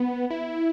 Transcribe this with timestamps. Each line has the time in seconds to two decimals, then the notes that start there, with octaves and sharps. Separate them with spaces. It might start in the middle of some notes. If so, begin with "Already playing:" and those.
Already playing: B3
0.30 E4